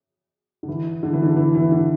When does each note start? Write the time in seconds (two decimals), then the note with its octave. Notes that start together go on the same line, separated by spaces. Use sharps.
0.63 D3
0.68 E3
1.03 D3
1.13 E3
1.23 D3
1.36 E3
1.55 E3
1.72 D3